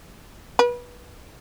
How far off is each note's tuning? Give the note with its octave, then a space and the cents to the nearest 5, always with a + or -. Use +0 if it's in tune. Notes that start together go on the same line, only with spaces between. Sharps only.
B4 -25